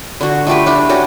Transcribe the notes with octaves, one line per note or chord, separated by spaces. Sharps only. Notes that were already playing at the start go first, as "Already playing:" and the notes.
D3 F#4
A3 F4 G4 B4
D4 E4
C#4 D4 F#4 G4